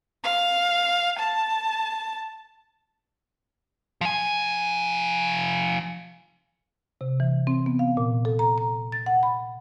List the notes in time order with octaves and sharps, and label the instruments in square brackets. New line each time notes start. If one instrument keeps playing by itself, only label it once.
[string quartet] F5
A5
[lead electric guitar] F3 G#5
[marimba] C3
E3
C4
B3
F5
A#2
A4
A#5
A#5
A6
F#5
B5